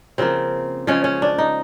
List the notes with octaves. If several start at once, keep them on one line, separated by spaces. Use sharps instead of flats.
C#3 F3 A#3 C4
C#3 F3 G#3 C#4
C#4
D4
D#4